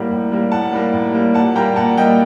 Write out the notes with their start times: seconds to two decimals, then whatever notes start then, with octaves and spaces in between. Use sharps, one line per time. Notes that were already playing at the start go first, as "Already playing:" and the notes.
Already playing: A2 G3 A#3 F#5
0.11 A2
0.32 G3 A#3
0.52 A2 F#5 A5
0.72 G3 A#3
0.93 A2
1.14 G3 A#3
1.34 A#2 F#5 A5
1.55 G3 A#3 G5 A#5
1.76 A#2 F#5 A5
1.97 G3 A#3 D#5 G5